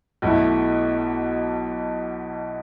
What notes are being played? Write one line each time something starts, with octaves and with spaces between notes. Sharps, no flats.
B1 B2 A3 E4